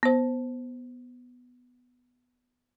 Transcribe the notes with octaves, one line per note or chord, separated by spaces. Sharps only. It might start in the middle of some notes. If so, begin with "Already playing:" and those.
B3 C5